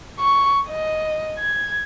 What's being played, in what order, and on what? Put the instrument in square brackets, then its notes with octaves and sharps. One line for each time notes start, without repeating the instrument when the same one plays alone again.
[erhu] C#6
D#5
G#6